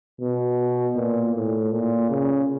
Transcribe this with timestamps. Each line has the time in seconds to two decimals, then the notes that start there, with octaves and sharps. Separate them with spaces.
0.21 B2
0.96 A#2
1.35 A2
1.72 A#2
2.09 C#3